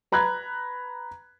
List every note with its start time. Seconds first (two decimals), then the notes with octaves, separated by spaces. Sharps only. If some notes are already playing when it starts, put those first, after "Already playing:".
0.12 B4 A#5 B5 F#6 G#6